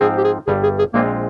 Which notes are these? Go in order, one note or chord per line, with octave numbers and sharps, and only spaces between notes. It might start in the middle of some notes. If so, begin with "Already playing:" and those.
G#2 F3 C4 G#4
G4
G#4
G1 G2 G3 G#4
G#4
G#4
A#1 A#2 G#3 A#3 C4 F4